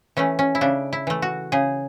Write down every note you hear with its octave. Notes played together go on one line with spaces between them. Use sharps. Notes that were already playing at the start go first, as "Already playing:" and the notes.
E3 A3 C#4
C#4
E4
C#3 D4
E4
E3 A3
F#4
C#3 G#4